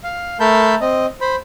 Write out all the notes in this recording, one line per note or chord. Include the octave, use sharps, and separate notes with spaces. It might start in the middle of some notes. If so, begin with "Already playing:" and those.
F5
A3 A4 A#4 A5 B5 G6
C4 D#5
C5 B5